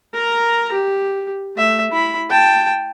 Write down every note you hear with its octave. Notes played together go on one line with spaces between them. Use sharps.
A#4 A#5
G4
A3 E5
E4 B5
G5 A5